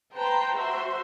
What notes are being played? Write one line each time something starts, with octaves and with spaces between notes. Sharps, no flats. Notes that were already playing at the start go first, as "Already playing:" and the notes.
B4 C5 G5 A5 A#5 C6
F#4 C5 E5 C6